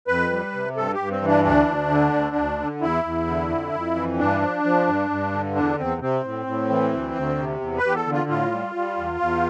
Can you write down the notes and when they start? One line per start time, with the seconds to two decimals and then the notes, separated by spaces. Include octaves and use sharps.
0.07 F2 B4
0.31 G3
0.53 C3
0.76 G2 A4
0.94 G4
0.99 G2
1.10 C4
1.22 E3
1.28 D4
1.44 D2 D4
1.67 D2
1.91 D3
2.13 D2
2.36 D2
2.59 D3
2.82 E2 E4
3.04 E2
3.27 D3
3.50 F2
3.73 F2
3.96 E3
4.19 G2 D4
4.42 F3
4.64 F3
4.87 G2
5.10 G2
5.33 D3
5.55 E2 D4
5.78 E2 C4
6.01 C3 C4
6.24 A2
6.46 A2
6.70 E3
6.93 D2
7.15 D2
7.38 C3
7.61 E2
7.78 B4
7.83 E2 G4
7.95 A4
8.06 D3
8.12 F4
8.29 A2 F4
8.52 G3
8.75 G3
8.97 E2
9.20 E2